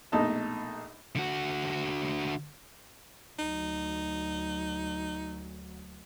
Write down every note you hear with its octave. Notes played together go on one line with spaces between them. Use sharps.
A#1 B2 A3 D#4 D#5 A5
D3 F#4
D2 F#3 D#4